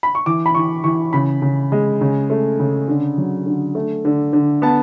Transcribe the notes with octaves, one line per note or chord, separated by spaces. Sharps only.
B5
C#6
E3 D6
B5
E3 C#6
E3 C#6
C#3 B5
C#3
G#3
C#3
A3
C#3
D3
F#3
D3
A3
D3
D3
B3 A5